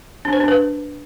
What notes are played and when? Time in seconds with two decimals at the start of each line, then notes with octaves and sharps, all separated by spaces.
0.25 D4
0.33 C5
0.40 D4
0.48 B4